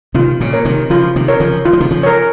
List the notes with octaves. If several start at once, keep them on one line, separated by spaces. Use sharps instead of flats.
C3 D#3 F4
A#2 C#3
A#4 C#5
C3 D#3
C#3 F3 F4
C3 D#3
A#4 C#5
C#3 F3
D#3 F4
F3
C3 D#3
C#3 F3
A#4 C#5